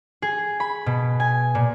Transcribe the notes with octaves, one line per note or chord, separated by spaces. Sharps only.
G#4
B5
B2
G#5
A#2